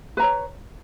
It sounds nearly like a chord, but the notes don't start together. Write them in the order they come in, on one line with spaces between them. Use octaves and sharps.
B4 A#5 C#5